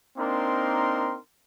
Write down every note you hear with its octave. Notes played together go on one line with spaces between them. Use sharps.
A#3 C4 D4 D#4 A#4 C6